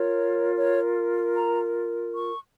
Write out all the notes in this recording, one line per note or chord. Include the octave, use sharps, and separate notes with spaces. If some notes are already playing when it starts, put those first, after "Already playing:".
Already playing: F4 A#4 C#5
C#5
A#5
C#6